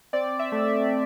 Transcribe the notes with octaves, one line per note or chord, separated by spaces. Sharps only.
C4 D5
E5
A3
E5